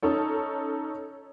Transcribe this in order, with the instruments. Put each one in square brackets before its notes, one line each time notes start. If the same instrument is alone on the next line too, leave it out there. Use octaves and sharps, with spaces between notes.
[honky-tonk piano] C#4 D#4 A4 C#5